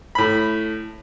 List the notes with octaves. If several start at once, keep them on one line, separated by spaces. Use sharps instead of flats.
A2 B5